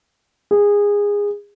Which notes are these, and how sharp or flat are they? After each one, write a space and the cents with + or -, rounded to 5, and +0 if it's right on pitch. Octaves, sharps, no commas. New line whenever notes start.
G#4 -20